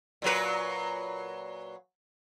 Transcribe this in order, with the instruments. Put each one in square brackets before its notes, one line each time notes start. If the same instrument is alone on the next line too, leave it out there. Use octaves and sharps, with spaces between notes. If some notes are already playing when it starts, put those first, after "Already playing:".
[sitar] A#2 F#3 B4